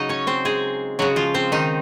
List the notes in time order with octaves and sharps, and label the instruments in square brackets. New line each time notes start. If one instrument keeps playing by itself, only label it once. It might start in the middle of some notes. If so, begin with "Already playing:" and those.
Already playing: [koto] C#3 F#3 D#4 D#5
C#4 C#5
C4 C5
G#3 G#4
C#3 F#3 G#3 F#4
F3 F4
C4 C5
D#3 D#4